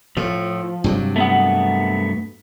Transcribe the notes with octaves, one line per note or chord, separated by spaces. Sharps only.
A2 F3
G2 C3 F#3
A3 B3 F#5